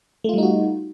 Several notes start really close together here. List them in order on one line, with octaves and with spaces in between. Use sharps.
A3 F4 G3 D#4 F#4